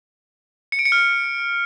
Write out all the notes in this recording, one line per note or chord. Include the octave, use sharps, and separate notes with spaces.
C#7
D7
C#7
F6